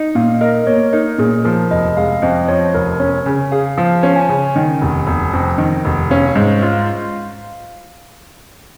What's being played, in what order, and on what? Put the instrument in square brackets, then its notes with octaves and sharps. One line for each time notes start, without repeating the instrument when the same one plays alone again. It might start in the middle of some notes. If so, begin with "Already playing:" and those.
Already playing: [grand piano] D#4
[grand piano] A#2 [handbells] F5
[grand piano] A#4 [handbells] D#5
[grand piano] A#3 [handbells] C#5
[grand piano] D#4 [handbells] A#4
[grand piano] A#2 [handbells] G#4
[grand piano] F3 [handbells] A#4
[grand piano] F1 [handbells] D#5
[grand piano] G#3 [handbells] F5
[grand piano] F2 [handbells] D#5
[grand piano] F3 [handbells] C#5
[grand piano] F1 [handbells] A#4
[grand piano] C#4 [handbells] C#5
[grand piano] C#3 [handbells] G#5
[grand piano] G#4 [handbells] F5
[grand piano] F3 [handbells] F5
[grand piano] C#4
[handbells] G#5
[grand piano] C#3
D#3
F1
F1
F2
D#3
F1
[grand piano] C#4 [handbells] F5
[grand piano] G#2
F4